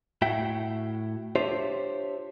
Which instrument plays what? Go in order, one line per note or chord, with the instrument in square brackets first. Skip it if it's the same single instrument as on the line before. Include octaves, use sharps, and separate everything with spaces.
[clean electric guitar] A2 F#4 E5 F#5 G5
D4 F4 G4 C5 C#5 E5